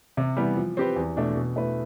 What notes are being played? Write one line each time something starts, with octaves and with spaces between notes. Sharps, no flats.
C3
E3 G3 B3
F3
C4 G4 B4
E2
B2 A3 D4
B2
A3 E4 B4